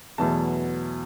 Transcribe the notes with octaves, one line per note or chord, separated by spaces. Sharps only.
E2 B2 F#3 A3 A5